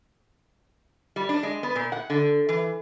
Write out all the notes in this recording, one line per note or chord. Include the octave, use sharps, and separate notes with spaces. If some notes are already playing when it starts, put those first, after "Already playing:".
G3
D4
G#3
B3
A#2
F#5
D3
E3